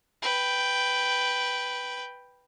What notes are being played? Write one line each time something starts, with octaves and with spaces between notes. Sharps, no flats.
B4 G5